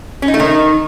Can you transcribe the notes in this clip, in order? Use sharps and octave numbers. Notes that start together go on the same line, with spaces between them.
C#4
D#4
A3
D#3